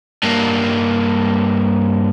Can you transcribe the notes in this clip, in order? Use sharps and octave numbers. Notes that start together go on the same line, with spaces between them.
G2 A#3